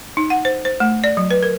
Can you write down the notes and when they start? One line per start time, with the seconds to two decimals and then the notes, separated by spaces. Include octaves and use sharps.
0.17 D#4
0.30 F#5
0.45 C5
0.65 C5
0.80 A3
1.04 D5
1.17 F#3
1.31 B4
1.43 A#4